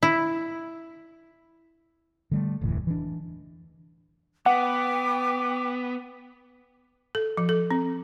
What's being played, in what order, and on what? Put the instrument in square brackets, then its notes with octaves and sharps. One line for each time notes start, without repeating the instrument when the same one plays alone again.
[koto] E4
[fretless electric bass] D3 G3 A3
F1 D2 A2 E3
E3 D4
[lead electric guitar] B3 [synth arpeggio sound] F#5 [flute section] G5 D6
[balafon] A4
F3
A4
C4